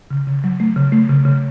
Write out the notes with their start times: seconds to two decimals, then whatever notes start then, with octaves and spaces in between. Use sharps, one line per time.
0.11 C#3
0.27 C#3
0.44 F#3
0.60 A3
0.76 C#3
0.92 A3
1.09 C#3
1.25 C#3